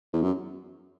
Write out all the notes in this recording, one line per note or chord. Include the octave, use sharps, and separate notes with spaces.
E2
F#2